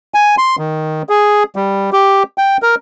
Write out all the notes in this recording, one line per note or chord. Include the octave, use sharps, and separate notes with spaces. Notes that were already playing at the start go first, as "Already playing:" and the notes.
G#5
C6
D#3
G#4
G3
G4
G5
A#4